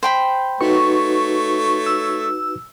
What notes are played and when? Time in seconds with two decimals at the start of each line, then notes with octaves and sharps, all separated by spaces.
0.03 C5 G5 B5
0.61 A3 D#4 F#4 B4 C#5 C#6
1.86 E6